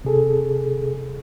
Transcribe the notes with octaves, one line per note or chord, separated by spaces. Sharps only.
C3 G#4 A4